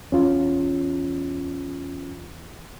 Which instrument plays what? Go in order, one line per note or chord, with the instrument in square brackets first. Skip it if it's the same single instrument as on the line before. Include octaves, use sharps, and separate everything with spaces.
[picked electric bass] E2 [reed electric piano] C#4 F4